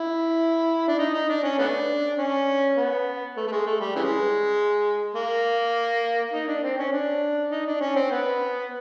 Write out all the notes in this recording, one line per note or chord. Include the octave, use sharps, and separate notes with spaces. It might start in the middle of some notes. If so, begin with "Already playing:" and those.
Already playing: E4
D4
D#4
D#4
D4
C#4
A3 B3 D4
C#4
B3
A3
A3
G#3
A3
G3
C#3 E3 G#3
A#3
D#4
D4
C4
C#4
D4
D#4
D4
C#4
C4
B3